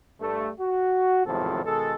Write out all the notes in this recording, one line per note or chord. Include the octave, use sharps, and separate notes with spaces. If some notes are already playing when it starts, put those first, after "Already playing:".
G2 A3
F#4
G#1 E2 A2 C3 F3 A4
B2 D#3 G#3 A4